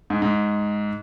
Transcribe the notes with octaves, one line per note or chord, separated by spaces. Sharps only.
G#2
G#2